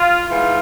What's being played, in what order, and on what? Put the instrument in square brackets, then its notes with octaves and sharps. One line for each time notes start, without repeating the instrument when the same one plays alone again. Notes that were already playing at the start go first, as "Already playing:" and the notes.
Already playing: [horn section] F4
G#2 E3 F4